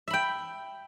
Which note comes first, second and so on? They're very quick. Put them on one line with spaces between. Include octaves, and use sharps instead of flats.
E5 B5 G5